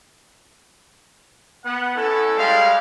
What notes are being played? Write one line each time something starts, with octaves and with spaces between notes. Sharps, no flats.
B3 F#5
C#4 E4 A4
G3 G#3 F5